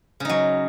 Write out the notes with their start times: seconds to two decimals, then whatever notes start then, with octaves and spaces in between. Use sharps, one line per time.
0.20 C#3
0.25 D#4
0.29 F#3